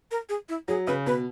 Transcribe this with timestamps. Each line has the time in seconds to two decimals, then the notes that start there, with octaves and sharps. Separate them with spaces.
0.11 A#4
0.29 G#4
0.49 E4
0.68 F#3 G#4
0.87 C#3 B4
1.06 B2 B4